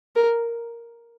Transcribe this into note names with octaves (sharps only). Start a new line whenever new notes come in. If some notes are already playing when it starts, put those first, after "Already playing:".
A#4